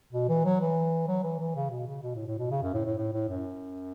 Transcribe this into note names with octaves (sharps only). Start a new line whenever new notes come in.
B2
E3
F#3
E3
F#3
E3
E3
C#3
B2
C#3
B2
A2
A2
B2
C#3
F#2
A2
A2
A2
A2
F#2